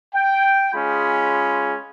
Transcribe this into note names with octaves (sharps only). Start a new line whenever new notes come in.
G5
G#3 C#4 F4 G#4 B5